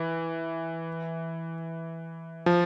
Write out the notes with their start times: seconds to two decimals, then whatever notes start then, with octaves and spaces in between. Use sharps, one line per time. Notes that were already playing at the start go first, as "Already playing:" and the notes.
Already playing: E3
2.46 F3